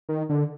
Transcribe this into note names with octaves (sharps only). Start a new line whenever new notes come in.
D#3
D3